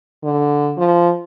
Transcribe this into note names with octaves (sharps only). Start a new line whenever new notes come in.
D3
F3